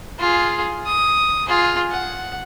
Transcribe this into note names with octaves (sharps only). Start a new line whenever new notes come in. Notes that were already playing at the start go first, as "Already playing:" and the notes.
F4 G#4
D#6
F4 G#4
F#5